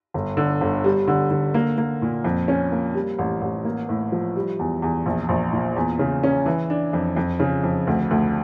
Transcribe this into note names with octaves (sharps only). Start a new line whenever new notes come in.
G1
D3
G1
G3
D3
D3
A#3
A#3
A#2
F2
C#4
A#3
G3
A1
A1
A#3
A2
F3
G3
E2
E2
A#1
A#1
A#2
E2
C#3
C#4
E3
D4
F2
F2
C#3
F2
D2
D2